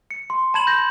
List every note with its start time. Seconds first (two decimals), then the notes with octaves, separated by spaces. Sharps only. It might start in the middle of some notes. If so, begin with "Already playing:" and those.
0.11 C#7
0.30 C6
0.54 A5 B5 G#6 E7 F#7
0.67 G6 G#6 A#6